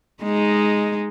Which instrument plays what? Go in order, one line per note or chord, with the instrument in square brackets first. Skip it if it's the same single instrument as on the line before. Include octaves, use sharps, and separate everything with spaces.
[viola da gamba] G#3 D#4